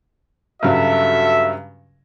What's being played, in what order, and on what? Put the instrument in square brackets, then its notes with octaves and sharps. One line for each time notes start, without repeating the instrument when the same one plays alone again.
[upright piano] G2 C#3 F#3 [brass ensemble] F#4 A4 E5